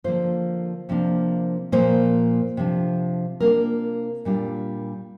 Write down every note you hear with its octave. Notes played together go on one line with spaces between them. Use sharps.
D3 F3 A#3 F4 C5
C3 F3 A#3 D4
A#2 F3 A#3 C5
C3 F3 D4
C3 A#3 D4 F4 A#4
A#2 G3 D4 F4